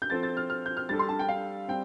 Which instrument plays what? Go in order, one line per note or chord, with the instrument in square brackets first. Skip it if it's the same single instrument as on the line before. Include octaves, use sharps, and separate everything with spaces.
[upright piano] G6
[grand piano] F3 C4 A4 C5 [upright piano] A6
[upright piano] A6
F6
F6
G6
F6
[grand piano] G3 D4 A4 [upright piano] A6
[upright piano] C6
A5
G5
F5
[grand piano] G3 C4 [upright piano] G5